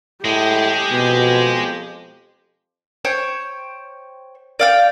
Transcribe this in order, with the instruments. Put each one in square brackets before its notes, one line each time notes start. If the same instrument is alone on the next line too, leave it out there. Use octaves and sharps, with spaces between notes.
[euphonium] A2 [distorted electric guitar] G#3 [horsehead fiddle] G4
[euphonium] F2 [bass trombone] B2
[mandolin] C5 C#5 G5
D5 F5 G5